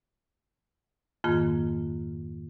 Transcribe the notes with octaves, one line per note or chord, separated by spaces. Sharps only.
F2 G#2 D#3 A#3 F4